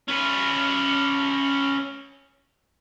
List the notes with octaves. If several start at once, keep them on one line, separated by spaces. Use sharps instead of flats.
C#4 B4